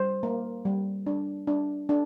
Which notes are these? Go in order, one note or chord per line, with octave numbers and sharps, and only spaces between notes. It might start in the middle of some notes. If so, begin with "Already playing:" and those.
Already playing: G3 C5
A#3
G3
D4
D4
D4